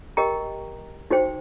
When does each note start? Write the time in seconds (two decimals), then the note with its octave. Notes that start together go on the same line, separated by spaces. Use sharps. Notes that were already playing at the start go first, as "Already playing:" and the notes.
0.17 G4 A#4 D#5 G5 A#5
1.11 D#4 F#4 C5 G5